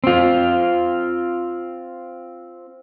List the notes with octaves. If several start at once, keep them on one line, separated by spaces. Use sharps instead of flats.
C4 F4